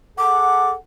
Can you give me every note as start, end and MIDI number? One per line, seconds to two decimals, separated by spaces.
0.18 0.75 68
0.18 0.75 69
0.18 0.75 78
0.18 0.71 86